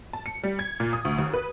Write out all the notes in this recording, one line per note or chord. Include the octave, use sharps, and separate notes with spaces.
A5
C#7
G3
G#6
A#2
D#6
D2
D#2
B4